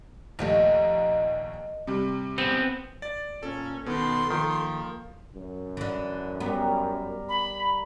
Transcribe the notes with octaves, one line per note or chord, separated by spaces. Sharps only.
A#1 D#2 A3 D#4 A#4 D#5
C3 G3
B3 C4 G#4
D5 A6
A#2 C#4 A4
B2 D#3 B3 A4 C6
D#3 F3 A#3
F#2
D3 E3
G3 B3 A#4
B5